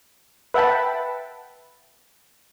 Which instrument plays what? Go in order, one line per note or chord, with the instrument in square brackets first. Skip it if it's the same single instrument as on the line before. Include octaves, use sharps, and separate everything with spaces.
[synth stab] B4 E5 F#5 G5 A5 B5